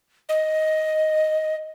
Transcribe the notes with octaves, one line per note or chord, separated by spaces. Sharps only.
D#5